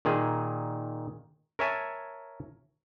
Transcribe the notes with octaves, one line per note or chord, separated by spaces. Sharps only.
A#2 D#3 G#4
A#4 C#5 E5 G#5 A5